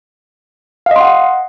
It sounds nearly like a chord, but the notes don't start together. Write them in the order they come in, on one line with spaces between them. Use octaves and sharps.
F5 D#5 C6 F#5